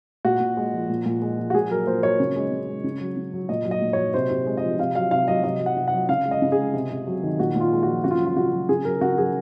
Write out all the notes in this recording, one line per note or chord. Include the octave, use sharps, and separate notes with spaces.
A#2 F#4
A#2
G#3
F3
A#2
A#2
G#3
F3
F#4
A#2 G#4
F#3 A#4
A#2 C5
F#3 C#5
C#3
G#3
C#3
G#3
C#3
F#3
C#3
F#3
A#2 D#5
F#3
D#5
A#2
F#3 C#5
C3 C5
C3
G#3
D#5
F3
C3 F5
F#3 F5
C3 F5
F#3 D#5
C3 D#5
F#3
F#5
C3
F#5
F#3
C#3 F5
G#3
D#5
C#3
G#4
G#3
C3
C3
F#3
D#3
A#2 F#4
A#2 F4
G#3
F3 F#4
C#3 F#4
F4
F#3
F4
C#3 F#4
F#3
C#3 G#4
F#3 A#4
C#3 F#4
F#3 G#4